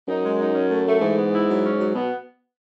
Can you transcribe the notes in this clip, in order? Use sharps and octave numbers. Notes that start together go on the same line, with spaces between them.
F#2 D#4
G#3
D#4
C#4
A3
A3
G#2 E3
B3
E4
F#3
C#4
F#3
B2 B3